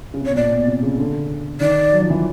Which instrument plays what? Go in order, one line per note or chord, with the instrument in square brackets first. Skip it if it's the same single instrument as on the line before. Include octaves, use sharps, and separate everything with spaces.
[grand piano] C#3
C3
[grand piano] B2 [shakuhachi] C#5
[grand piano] A#2 [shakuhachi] D5
[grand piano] B2
C3
C#3
D3
[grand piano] D#3 [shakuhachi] D5
[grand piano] F#3
F3
E3